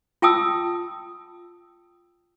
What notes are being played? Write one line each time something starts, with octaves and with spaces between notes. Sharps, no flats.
F4 G5 A5 D#6 E6